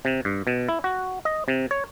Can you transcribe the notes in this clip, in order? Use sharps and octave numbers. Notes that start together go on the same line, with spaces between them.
C3
G2
B2
E4
F#4
D#5
C3
C#5